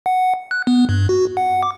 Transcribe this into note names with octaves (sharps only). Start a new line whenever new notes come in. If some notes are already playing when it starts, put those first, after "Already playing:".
F#5
F#6
B3
G2
F#4
F#5
D6